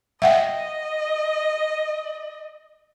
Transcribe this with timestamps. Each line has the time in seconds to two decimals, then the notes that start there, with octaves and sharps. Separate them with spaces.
0.22 D#5 E5 F#5 G5